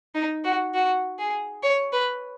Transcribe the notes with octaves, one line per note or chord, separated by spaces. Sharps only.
D#4
F#4
F#4
G#4
C#5
B4